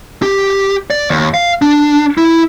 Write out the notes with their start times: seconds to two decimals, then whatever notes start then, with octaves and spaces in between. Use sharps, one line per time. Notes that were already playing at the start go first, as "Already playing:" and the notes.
0.23 G4
0.90 D5
1.10 D#2
1.34 F5
1.62 D4
2.18 E4